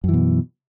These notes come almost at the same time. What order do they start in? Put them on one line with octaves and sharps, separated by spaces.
F#2 E3 B2